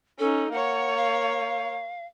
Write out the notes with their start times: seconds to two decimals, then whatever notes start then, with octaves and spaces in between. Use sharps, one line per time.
0.19 C#4 D#4 A4
0.52 A#3 C#5 F#5
0.97 F5